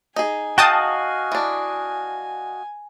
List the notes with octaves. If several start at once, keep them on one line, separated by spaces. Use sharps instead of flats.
D#4 G#4 G#5
F#4 D#5 F5 G5 A5 D#6
E3 D4